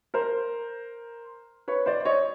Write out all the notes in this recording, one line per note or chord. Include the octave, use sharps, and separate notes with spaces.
A#4 C5
B4 C#5
C5 D5
C#5 D#5